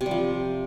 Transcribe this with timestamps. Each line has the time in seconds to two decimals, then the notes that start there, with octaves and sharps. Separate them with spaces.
0.01 C3
0.06 G3
0.11 F3